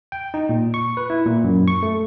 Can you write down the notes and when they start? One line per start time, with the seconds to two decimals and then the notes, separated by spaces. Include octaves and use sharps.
0.12 G5
0.34 D#4
0.49 A#2
0.74 C#6
0.97 B4
1.10 E4
1.26 A#2
1.44 F#2
1.68 C#6
1.83 A3